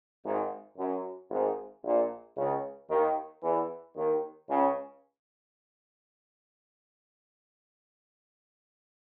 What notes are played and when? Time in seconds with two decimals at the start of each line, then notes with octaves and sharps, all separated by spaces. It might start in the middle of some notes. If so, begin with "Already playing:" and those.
0.25 G#1 G#2
0.78 F#2
1.31 G#1 G#2
1.84 A#1 A#2
2.37 C#2 C#3
2.90 D#2 D#3
3.43 E2 E3
3.96 D#2 D#3
4.49 C#2 C#3